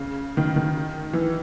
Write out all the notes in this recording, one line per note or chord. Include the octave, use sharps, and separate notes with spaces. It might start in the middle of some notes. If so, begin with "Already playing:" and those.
Already playing: C#3
D#3
D#3
E3